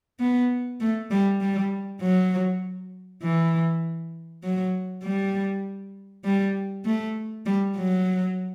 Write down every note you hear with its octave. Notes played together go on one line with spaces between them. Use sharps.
B3
A3
G3
G3
F#3
E3
F#3
G3
G3
A3
G3
F#3